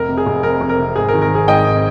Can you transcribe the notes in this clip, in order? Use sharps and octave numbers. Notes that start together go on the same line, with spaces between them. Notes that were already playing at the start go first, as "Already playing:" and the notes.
Already playing: F1 A#4
C3
G#4
F1
F2 A#4
F1
A#4
C3
G#1 G#4
A#4
D#3
A#4
G#1 G#4
G#2 D#5 G5
G#1